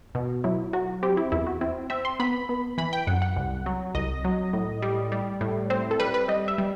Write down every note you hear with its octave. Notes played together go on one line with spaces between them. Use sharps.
B2
F#3 E4
F#3 F#4
C4 G4
E4
E2 E4
F#4
C4 E4
C4 E5
C6
B3 B5
B3
E3 B5
G5
F#2 F#5
F#5
C2
F#3
C2 D#5
F#3
A2
G3
G3
A2
C4 C5
A4
G3 B4
B4
G3 D#5
E5
G3